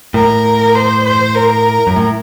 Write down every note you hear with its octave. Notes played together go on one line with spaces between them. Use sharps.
A2 A#4
C5
C5
A#4
F#2
A2